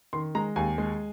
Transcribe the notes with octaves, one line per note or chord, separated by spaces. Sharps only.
D#3 C6
G#3 A#5
D#2 G#5
G#3